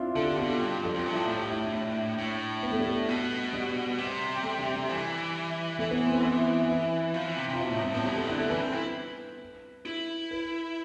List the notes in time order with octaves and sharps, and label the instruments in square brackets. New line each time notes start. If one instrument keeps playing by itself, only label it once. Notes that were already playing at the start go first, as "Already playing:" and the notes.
Already playing: [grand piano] C4 D4 E4 F4
[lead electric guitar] D3 [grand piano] A4
[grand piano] G4
[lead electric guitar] B2 [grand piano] F4
[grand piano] G4
[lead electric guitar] G2
[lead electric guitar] F2 [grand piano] A4
[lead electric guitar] F2 [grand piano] F4
[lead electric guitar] G2
[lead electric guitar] A2 [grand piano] E4
[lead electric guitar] A2
[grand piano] G4
E4
D4
D4
[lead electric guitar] A2
[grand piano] B3
A3
G3
A3
[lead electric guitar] B2
[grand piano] G3
[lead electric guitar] C3
[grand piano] A3
G3
G3
[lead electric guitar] E3
[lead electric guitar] E3 [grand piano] A3
[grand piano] B3
C4
B3
E4
E4
[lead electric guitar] F3
E3
C3
[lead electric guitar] C3 [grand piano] F4
[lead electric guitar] B2 [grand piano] E4
[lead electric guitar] A2 [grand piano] D4
[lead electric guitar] G2 [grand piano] C4
[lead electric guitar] A2 [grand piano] B3
[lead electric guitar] B2 [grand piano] G3
[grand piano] A3
[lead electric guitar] D3 [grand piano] E4
[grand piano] A4
[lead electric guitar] E3 [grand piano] B4
[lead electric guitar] C4
E4
E4
[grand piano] B4